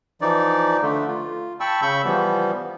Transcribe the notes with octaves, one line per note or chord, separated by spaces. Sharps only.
E3 F3 D#4 D5
D3 A3
F4
G5 A5 B5 C#6 E6
C#3 B5 C#6 E6 G6
E3 F3 G3 B3